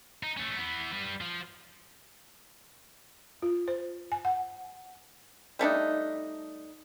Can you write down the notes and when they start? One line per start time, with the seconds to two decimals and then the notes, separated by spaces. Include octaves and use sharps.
0.23 D#4
0.37 A3 C#4
0.57 E3 B3
0.92 G3 B4
1.21 F3
3.42 F4
3.68 C5
4.12 G#5
4.25 F#5
5.59 G3 A3 D4 D#4